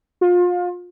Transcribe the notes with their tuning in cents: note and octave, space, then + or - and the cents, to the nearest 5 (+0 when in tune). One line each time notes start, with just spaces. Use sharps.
F4 +30